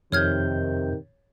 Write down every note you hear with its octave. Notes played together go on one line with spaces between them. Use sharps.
F2 C3 D#3 C#5 F6 G6 G#6